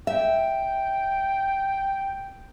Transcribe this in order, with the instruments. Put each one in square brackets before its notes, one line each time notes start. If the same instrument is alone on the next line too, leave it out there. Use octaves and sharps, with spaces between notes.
[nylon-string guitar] E5 [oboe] G5